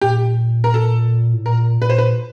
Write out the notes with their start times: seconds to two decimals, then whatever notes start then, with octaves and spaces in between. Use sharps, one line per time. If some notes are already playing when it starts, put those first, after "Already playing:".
0.01 A#2 G4
0.64 A#4
0.74 A4
1.34 A2
1.45 A#2 A#4
1.81 A#2 B4
1.90 C5
1.98 B4